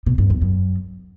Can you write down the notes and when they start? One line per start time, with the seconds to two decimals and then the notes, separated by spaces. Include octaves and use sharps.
0.06 B2
0.18 G2
0.30 E2
0.42 F#2